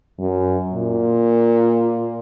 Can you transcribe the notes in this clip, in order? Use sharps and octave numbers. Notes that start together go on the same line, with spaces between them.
F#2
A#2